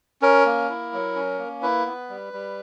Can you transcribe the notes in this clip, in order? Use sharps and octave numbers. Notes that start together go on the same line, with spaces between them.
C#4 A#4
A#3
E4
F#3
C#4
A#3
E4 B4
B3
G3
G3